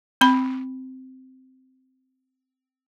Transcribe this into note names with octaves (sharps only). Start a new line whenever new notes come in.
C4 B5